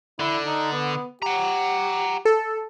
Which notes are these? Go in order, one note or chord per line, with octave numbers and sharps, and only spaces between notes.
D3 E4
D#4
B3
G4 F#5 A#5
A4